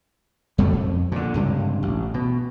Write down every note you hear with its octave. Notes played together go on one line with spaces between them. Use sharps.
F2 B2 G3 A3
F2
A#2 D3
C#2 G2 C3
A1
B2